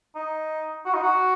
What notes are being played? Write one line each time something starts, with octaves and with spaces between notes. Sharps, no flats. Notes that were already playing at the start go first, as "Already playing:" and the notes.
D#4
F#4
D#4
F#4